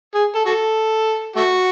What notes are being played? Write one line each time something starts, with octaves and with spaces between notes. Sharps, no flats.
G#4
A4
F#4 A4
A3 F#4